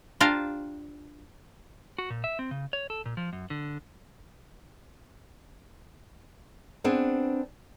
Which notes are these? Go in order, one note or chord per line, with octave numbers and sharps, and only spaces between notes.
D4 F4 G4 C5 F5 A#5
F#4
A#2
E5
C4
C#3
C#5
A4
A#2
F3
F#2
D3
B3 C4 D4 G#4